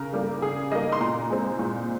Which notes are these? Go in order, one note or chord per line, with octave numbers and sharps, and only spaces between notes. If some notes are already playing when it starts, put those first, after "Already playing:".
Already playing: C#3 A#4
G3 A#3
C#3 G#4
G3 A#3 D#5
C6
A#2 A#5
G#3 C4
A#2